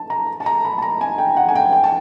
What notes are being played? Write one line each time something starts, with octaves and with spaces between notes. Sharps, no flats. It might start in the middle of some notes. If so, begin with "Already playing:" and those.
Already playing: A5
A#5
A5
A#5
B5
A5
A#5
G#5
G5
F#5
G#5
G5
G5
A5